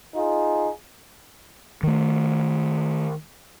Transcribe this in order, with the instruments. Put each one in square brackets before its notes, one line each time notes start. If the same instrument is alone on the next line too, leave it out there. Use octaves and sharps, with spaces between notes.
[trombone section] D#4 F4 G#4
[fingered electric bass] D#3 A3